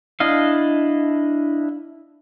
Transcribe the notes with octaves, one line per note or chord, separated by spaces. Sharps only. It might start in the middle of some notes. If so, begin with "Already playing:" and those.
D4 E4 D#5 F5